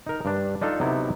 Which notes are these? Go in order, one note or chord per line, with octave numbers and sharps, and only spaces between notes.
D#4 A#4
G2 D4
D4 D#4 F4 A4
C3 F#3 B3 D#4 E4